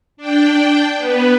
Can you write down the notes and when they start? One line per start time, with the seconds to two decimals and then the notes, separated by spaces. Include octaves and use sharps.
0.17 D4 G5
0.97 B3 B4